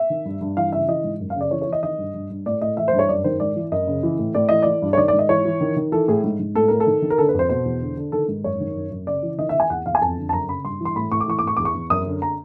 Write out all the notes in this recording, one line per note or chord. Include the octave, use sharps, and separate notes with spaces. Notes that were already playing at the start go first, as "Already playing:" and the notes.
Already playing: E5
D#3
G2
G2
E3 F5
C#3 E5
E3 D#5
G#2
F#2
F5
C#3 D5
E3 C#5
C#5
E3
D#5
D#3 D#5
G2
G2
G2
A2 D5
A2 D#5
E3 E5
C5
G2
C#5
F#2 D5
D#3 C5
G#2 D5
E3
F#2 D#5
C#3
E3
A2
A2 D5
E3 D#5
E3 D5
G2
C#5
D#3 D5
D5
G#2
D#5
E3 C#5
E3
D#3
D#3
E3 A4
A2 G#4
G#2
G#2
A2 A4
A2 A#4
A4
D#3
D#3
A#4
D3 A4
B4
F2
C5
B2 C5
E2
D3
D3
D#3 A4
G#2
F#2 C#5
D#3
F#2
F#2
C#3 D5
E3
D#3 D#5
E5
D#3
G#5
E2 F#5
E2 F5
G#5
F2 A5
D3
A5
F#2 A#5
C#3 B5
G2 C6
E3 C6
A2 B5
A2 C#6
D6
E3 C#6
D6
A2 C#6
E2 D6
C#6
E2
F#2 D#6
D3
A#5